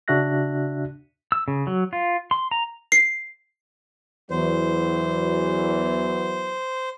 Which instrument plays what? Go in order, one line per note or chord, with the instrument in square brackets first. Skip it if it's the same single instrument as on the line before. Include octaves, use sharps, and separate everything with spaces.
[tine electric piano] C#3 D4 F#4 E5 F#6 A#6
[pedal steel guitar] E6
C#3
F#3
F4
C6
A#5
[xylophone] C7
[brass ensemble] E2 E3 F#3 [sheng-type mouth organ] C5